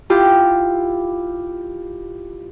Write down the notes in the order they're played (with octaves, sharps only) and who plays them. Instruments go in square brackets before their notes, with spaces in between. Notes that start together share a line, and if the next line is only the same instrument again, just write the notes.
[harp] E4 F4 G4